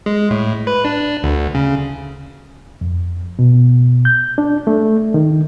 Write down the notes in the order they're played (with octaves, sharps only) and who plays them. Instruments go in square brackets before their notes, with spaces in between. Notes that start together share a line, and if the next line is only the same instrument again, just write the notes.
[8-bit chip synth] G#3
A2
B4
D4
D2
C#3
[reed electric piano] F2
B2
G6
D4
A3
D#3